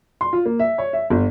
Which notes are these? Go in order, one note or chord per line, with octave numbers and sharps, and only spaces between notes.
C6
F4
A#3
E5
C#5
E5
G1